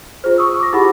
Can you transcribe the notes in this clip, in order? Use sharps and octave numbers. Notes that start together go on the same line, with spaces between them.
F4 G#4 C5
C#6 D#6 E6
D6 A#6
E4 F4 G4 G#4 F#5 B5